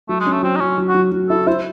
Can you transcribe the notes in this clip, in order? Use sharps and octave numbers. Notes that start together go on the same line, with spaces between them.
F#3 A3
G#3
C#4
A3
F#3 C4
D#4
F#3 C#4
F#3
F#4
F#3
F#3
E4 A4
E4 C5